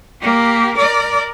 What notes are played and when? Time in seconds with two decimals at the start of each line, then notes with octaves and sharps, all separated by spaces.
0.22 A#3 G4
0.77 A#4 D5